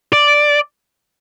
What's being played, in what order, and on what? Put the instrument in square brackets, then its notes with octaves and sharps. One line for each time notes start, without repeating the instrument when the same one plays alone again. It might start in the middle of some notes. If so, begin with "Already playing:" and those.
[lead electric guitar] D5